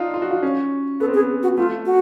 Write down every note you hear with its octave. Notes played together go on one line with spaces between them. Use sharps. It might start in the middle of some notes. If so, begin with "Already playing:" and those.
Already playing: D4 D#4 F4
F4
F#4
F4
C#4
B3 A4
C4
B3 G#4
F#4
A3 F4
F#4